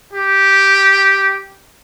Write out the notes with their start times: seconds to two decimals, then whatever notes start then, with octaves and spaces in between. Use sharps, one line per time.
0.13 G4